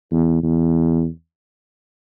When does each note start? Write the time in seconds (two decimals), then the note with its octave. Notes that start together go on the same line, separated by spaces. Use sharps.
0.12 E2
0.43 E2